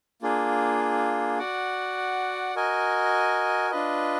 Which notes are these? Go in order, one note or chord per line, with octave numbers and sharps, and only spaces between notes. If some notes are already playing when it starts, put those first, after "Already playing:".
A#3 D4 F4 G#4
F#4 D5 F#5
F#4 A#4 D#5 G#5
D4 F4 B4 D#5